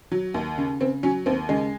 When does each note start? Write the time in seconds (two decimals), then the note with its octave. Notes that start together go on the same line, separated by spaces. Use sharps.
0.12 F#3
0.34 D#2
0.58 C#3
0.80 C#3 C4
1.03 F#3 C#4
1.26 D#2 C4
1.49 C#3 G#3